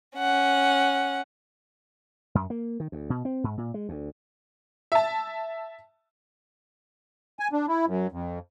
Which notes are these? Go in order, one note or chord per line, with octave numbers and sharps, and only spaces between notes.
C#4 F#5
F#2
A#3
D#3
D2
B2
C4
G#2
A#2
G#3
D2
E5 A5
G#5
D4
E4
F#2
F2